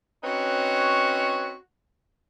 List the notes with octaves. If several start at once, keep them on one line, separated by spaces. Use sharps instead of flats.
C4 C#4 D#4 F#4 B4 C#5